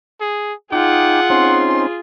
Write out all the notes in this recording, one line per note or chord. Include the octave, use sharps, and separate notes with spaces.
G#4
D#4 F4 G#4 F#5 G5 D6
C4 C#4 D#4 C6